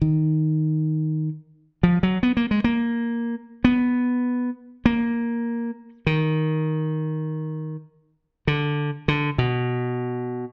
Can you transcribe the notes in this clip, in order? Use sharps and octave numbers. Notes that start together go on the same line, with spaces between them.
D#3
F3
F#3
B3
A#3
G#3
A#3
B3
A#3
D#3
D3
D3
B2